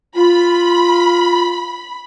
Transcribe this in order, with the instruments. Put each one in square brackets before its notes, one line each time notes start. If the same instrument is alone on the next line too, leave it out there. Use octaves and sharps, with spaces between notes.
[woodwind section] F4 [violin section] B5